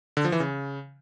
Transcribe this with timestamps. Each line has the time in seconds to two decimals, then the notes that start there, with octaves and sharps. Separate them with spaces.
0.17 D3
0.25 F3
0.32 E3
0.40 C#3